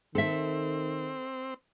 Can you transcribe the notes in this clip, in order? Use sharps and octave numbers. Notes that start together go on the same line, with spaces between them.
D#3 C4 A4 E5